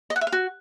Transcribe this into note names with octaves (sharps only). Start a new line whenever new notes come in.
D#5
F#5
E5
F5
F#4